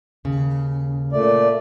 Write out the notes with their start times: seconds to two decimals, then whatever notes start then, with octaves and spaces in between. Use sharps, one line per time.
0.25 D#2 C#3
1.13 A#2 A3 D5